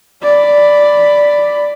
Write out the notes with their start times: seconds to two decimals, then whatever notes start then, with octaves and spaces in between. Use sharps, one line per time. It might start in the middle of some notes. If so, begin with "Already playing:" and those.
0.22 D5 B5